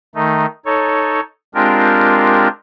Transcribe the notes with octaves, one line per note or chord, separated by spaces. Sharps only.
D#3 A3 D#4
D#4 A4 C#5
G#3 C4 D4 F4 G4 A#4